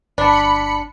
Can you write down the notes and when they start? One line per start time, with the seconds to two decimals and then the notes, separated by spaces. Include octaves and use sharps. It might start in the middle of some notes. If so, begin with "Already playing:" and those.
0.18 G1 D4 A5 B5 C#7